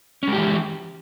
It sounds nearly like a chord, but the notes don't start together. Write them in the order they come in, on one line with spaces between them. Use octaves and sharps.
C#4 G#3 G4 E3